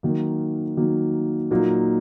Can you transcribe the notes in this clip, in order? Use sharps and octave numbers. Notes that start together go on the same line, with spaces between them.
D#3 F#3 A#3
D#3 F#3 A#3
A#2 F#3 A#3 D#4